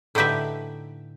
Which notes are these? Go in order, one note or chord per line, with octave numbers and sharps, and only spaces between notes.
A2 D3 D#4 G4 B4 E5